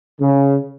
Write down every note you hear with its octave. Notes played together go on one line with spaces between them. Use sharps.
C#3